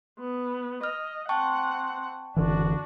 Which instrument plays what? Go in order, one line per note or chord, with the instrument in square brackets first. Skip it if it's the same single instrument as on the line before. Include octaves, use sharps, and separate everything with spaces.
[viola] B3
[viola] D#5 [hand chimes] F6
[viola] C4 F#5 [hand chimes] G5 A5 C#6
[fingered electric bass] F#1 D3 E3 [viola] D4 F#4